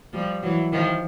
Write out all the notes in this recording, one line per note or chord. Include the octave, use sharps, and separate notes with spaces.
F3 G3
E3 F#3
D#3 F3